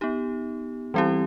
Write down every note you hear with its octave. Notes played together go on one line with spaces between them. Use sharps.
B3 D#4 G4
E3 G3 C4 E4 G4